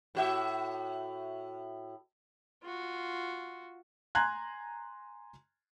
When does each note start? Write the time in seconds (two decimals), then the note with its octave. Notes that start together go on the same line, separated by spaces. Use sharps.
0.15 A2 F#4 E5
2.63 F4 F#4
4.15 G#5 A#5 C6 F#6 G#6